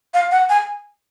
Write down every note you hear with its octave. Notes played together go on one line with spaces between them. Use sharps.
F5
F#5
G#5